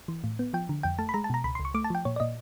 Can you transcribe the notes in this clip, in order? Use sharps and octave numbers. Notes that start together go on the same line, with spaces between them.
E3
A2
B3
F3 G5
D3
F2 G5
A3 A5
B5
G#3 A#5
A5
B2 A#5
C#2 B5
C6
C#2
C#6
A3 D6
A5
F3 G5
A#2 C#5
D5
A#2 D#5